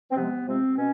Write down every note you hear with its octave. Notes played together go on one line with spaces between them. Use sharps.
C4
C3 F3 G#3 B3
C3 F3 G#3 C4
B2 C#4